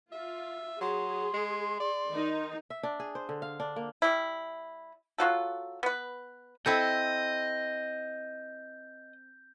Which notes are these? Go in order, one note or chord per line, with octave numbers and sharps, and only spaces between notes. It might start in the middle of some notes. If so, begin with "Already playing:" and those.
F4 E5
F#3 G#4 C6
G#3
D5
D#3 D#4
E5
D4
G#4
C5
D3
F5
D4
A#3
G3 E4
F#3 F4 F#4 A4
B3 B4
C4 E4 A4 D#5 G6